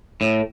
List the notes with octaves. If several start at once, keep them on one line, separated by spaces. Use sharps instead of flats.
A2